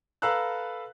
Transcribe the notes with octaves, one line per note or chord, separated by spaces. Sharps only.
A4 B4 F5 A#5 E6 F#6